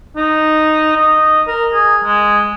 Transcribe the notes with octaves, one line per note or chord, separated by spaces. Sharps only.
D#4
D#5
A#4
G#4
G#3